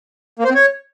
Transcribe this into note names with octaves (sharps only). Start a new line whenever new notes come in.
A#3
C5
C4
C#5